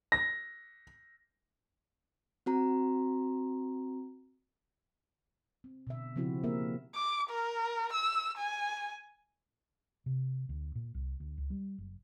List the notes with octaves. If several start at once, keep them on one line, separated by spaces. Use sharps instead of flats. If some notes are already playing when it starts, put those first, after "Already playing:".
A#6
C4 F#4 A#5
C4
B2 D3 E5
C#3 F3 C4 E4 F#4
A#3 G4 A#4 E5
D6
A#4
E6
G#5
C3
D2
A#2
C2
D2
C#2
G3
F#1